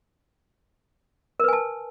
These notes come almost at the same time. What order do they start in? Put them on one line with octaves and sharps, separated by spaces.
A#4 B4 G#5 A5